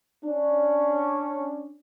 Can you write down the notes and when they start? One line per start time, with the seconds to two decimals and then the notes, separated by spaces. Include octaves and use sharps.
0.25 C#4 D4